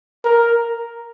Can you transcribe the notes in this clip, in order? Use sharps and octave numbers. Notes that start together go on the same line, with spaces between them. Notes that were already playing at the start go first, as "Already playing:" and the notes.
A#4